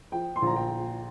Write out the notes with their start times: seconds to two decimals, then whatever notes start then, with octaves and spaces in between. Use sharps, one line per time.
0.12 F3 G5
0.36 C6
0.42 A#1 A#5
0.56 G5